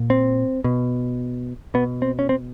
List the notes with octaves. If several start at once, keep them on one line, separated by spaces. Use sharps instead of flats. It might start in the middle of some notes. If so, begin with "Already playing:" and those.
Already playing: A#2
C4
B2
B2 B3
C4
C#4
C4